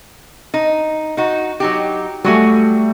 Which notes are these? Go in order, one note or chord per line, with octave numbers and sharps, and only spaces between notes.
D#4
D#4 F#4
F#3 D#4 G4
F#3 G3 A3 F#4 G#5